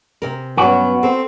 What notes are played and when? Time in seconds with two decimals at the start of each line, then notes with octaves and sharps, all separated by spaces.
0.22 C3 A#4
0.57 G2 F#3 B3 C#4 F#4
1.03 C4 A4